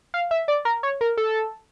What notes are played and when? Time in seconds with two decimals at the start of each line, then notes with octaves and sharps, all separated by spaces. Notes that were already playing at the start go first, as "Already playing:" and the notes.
0.14 F5
0.31 E5
0.48 D5
0.65 A#4
0.83 C#5
1.01 A#4
1.17 A4